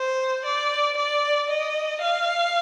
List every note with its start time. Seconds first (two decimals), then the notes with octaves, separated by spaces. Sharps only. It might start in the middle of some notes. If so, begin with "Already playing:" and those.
Already playing: C5
0.45 D5
0.97 D5
1.50 D#5
2.01 F5